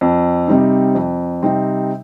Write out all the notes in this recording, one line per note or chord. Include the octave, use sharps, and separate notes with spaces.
F2
C3 G3 C4 D#4
F2
C3 G3 C4 D#4